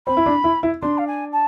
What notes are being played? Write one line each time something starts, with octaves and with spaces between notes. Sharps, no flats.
C4 B5
E4
D4
E4
E4
D4 C6
F5
G#5
A5